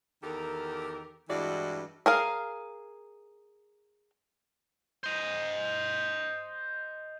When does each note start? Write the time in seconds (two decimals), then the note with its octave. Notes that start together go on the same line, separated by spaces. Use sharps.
0.23 E2 D#3 G4 A4 A#4
1.29 G2 E3 G#3 E4 F#4 D5
2.06 G#4 A#4 F5
5.04 C5 D#5